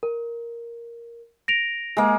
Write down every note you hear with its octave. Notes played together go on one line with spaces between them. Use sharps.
A#4
A#6 D7 F7
G#3 A#3